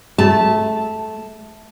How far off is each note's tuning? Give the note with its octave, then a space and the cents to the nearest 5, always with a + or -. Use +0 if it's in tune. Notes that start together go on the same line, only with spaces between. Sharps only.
A3 -20 A5 +0